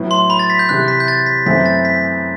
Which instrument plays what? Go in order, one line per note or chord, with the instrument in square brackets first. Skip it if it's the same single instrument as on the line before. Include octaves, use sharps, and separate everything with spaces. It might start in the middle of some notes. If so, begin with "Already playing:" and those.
Already playing: [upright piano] A2 F#3 B3 E4
[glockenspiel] C6
B5
A6
B6
G6
[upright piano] C3 E3 G3 [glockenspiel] F#6
[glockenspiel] B6
G6
A6
B6
[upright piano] F#2 E3 A3 C4 E4 [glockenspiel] B6
[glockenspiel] A6
B6